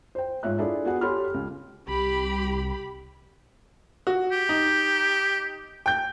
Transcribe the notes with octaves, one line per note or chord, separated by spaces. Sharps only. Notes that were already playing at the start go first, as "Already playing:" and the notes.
C5 G5
G#2 F4 C#5 E5 F#6
D4 E4 F4 G#4 A4 D5
B3 F#4 G#4 F#5
G4 A4 C#5 B5 C6 F6
C#2
C2 G4 B5
F#4
G4
D#4
G5 G6